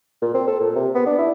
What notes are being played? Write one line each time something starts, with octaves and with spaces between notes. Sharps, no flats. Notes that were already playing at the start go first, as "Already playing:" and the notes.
A#2
C4
A4
A#2
C3
B3
D4
E4